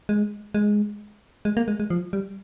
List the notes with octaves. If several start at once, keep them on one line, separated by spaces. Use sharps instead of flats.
G#3
G#3
G#3
A#3
G#3
G#3
F3
G3